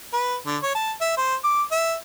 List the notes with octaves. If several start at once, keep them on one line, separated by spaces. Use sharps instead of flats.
B4
D3
C#5
A5
E5
C5
D6
E5